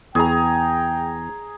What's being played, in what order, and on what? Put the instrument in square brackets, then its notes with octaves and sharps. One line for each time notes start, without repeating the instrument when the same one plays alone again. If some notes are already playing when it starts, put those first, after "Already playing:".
[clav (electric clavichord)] E2 [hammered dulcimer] G#4 A#5 [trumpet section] G5